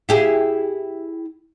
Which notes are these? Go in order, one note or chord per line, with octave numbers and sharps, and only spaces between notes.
E4 G4 G#4